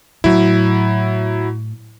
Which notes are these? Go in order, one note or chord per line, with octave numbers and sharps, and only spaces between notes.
A2 F#3 E4